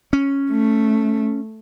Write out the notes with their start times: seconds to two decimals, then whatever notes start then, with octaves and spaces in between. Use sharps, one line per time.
0.13 C#4
0.51 A3